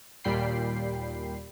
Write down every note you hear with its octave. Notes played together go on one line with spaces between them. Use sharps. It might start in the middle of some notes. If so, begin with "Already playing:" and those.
D#2 A#2 G3 G5 B5 C7